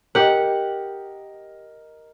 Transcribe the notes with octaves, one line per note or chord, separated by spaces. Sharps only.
G4 A#4 D#5 F#5